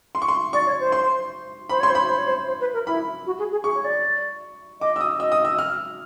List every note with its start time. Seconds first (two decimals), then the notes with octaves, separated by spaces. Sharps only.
0.15 C6
0.22 C#6
0.28 C6
0.53 D5 C#6
0.66 C#5
0.80 C5
0.92 C6
1.69 C5 B5
1.80 C#5 C6
1.89 C5
1.95 C#5 B5
2.09 C5
2.18 C#5
2.28 C5
2.47 C5
2.60 B4
2.73 A#4
2.87 E4 B5
3.26 F#4
3.39 G#4
3.51 G#4
3.64 G#4 C#6
3.75 C#5
3.84 D5
4.80 D#5 D6
4.96 E6
5.01 D#6
5.19 D#5 E6
5.32 D#6
5.45 E6
5.58 F6